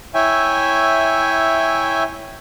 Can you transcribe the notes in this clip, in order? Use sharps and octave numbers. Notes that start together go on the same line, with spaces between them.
E4 C#5 E5 G5 G#5